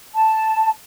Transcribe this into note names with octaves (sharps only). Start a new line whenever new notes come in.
A5